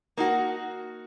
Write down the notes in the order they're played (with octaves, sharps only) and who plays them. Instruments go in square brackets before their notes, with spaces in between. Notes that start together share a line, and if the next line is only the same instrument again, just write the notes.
[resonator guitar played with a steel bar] A#3 D#4 F#4